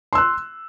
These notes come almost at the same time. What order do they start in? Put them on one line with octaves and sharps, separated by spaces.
C6 E6 F#6